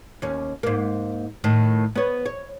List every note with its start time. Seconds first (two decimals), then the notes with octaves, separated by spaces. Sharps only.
0.22 D#2 C#4
0.63 G#2 A#3
1.44 A2 D#3
1.95 B3 C#5
2.26 C#5